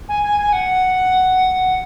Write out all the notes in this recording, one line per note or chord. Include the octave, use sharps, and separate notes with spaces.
G#5
G#5
G#5
F#5